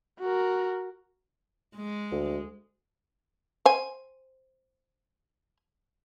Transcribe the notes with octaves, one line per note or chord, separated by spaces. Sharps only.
F#4 A#4
G#3
D2
C5 G#5